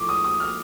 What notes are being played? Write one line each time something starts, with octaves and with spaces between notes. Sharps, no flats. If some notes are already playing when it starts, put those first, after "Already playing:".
Already playing: A2 F3 A3 C#6 D6
D#6
D#6
F6